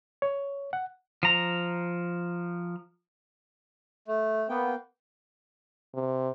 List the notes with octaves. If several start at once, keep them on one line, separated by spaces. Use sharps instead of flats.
C#5
F#5
F3 A#5
A3
A#3 B3 G5
C3